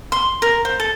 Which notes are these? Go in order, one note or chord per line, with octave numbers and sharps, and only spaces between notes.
C6
A#4
C5
A4